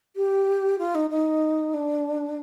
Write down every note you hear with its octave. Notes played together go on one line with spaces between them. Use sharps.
G4
F4
D#4
D#4
D4